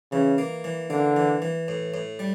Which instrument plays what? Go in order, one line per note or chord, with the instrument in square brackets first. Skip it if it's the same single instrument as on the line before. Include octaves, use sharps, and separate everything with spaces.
[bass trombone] C#3 [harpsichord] E3
[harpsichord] A#3
E3
[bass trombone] D3 [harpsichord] A#3
[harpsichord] E3
E3
A2
A2
G3